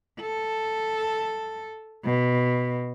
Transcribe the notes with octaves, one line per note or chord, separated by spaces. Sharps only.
A4
B2